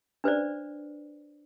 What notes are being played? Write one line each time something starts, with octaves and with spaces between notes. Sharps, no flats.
D4 B4 C5 D5